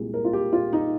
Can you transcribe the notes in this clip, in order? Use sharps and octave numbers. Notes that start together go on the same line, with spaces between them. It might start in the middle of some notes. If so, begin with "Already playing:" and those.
Already playing: C2 A#2 G#3
A#4
F4
G4
F4
D#4